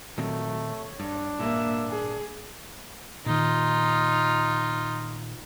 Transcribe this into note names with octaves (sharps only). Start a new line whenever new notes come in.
A#2 D#3 F#3 A3 C4
C#5
G2 D4
G#1 G2 A#2 A#3 E5
G#4
A#2 D#3 D#4 F4